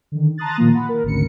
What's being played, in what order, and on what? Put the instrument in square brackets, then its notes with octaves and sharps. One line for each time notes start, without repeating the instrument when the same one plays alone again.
[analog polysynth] D3 D#3
A5 A#5 C6 D#6 F#6 A6
A#2 D#3 F3 A#3
F#5 B5
A#4
G#1 D2 C#3 C#7